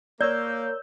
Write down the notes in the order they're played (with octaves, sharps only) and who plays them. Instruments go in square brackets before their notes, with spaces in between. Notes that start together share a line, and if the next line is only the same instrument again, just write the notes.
[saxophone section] A#3 [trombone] A#4 [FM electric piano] C#5 E6 G6 [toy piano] D5